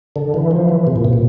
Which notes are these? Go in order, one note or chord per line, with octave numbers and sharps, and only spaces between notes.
D3
E3
F3
E3
C3
A#2
C3
A#2